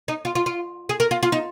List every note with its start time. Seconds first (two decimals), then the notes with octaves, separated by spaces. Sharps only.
0.08 D#4
0.25 F4
0.35 F4
0.46 F4
0.89 G#4
1.00 A#4
1.11 F4
1.23 F4
1.32 D#4